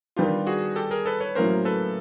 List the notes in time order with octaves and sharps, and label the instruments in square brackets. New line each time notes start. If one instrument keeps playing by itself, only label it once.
[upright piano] D#3 G3 B3 D4 [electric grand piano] F4 G4
[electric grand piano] F#4 G#4
G4 A4
G#4 A#4
A4 B4
B4 C#5
[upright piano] A2 F#3 A#3 C#4 [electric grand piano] A#4 C5
[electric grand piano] A4 B4